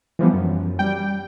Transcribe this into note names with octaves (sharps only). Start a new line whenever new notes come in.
E3 F3 G3 B3
F#2
G3 G5